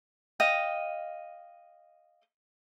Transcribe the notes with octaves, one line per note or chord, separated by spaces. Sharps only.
D#5 F5 G5